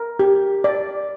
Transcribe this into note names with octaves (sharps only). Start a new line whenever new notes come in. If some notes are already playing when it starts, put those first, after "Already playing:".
Already playing: A#4
G4
D5